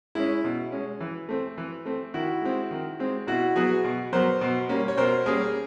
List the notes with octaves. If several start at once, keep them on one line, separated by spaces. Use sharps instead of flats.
G#3 C#4 E4
B2
G#3 C#4
E3
A3 C4
E3
A3 C4
D#3 E4 F#4
G#3 C4
D#3
G#3 C4
B2 E4 F#4
F#3 B3 F#4 G#4
B2
F#3 B3 A#4 C5
B2
G3 A#3 C#4
C#5
B2 A#4 C5
G3 A#3 C#4 G#4 A#4